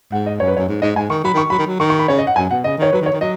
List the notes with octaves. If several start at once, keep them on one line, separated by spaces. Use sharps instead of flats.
G#2 F#5
D#5
F#2 C#5
B4
F#2 C#5
G#2
G#2 D#5
G#2 G#5
D#3 C#6
F#3 B5
D#3 C#6
F#3 B5
D#3
F#3
D#3 C#6
C#6
B5
C#3 C#5
D#5
F#5
F#2 G#5
B2 F#5
C#3 D#5
D#3 C#5
F#3 B4
D#3
C#5
D#3
F#3 D#5